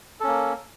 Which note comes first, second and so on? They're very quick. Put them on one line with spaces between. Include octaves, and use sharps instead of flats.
A4 C#4 A#3